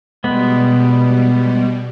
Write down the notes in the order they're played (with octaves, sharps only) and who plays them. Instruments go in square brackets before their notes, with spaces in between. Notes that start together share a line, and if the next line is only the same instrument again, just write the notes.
[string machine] B2 G3 [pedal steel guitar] G#3 B3